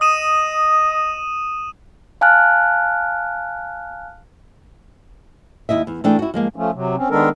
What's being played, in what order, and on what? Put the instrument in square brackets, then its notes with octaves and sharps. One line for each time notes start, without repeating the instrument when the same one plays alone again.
[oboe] D#5 [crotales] D#6 D#7 E7
[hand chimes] F5 G#5 A5 F6 F#6
[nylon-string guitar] D#2 E4 D#5 E5
E2
E3 A3 D4 G#4 G5
E4 F#4
F3 G#3 A#3
[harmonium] F3 A3 C#4
C3 F#3
C4 C#4
D#3 G#3 B3 D4 A4 A#4